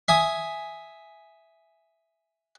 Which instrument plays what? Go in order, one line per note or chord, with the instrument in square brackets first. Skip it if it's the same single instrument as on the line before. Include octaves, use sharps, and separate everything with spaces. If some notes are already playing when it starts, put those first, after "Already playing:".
[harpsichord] E5 G#5 D#6